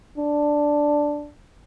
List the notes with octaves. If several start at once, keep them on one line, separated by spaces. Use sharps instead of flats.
D4